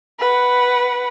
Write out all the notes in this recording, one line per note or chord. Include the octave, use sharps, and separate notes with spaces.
B4 F#5